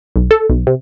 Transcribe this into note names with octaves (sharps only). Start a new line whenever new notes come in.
B1
A4
B1
C3